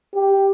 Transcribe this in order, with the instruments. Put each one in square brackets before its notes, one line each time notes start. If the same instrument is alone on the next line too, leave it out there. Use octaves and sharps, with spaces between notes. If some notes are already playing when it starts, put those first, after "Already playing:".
[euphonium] G4